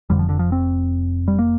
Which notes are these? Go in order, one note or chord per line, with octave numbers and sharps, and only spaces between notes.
F1 F2 D3 G3
F3
D3
F3
C4
G3
A#3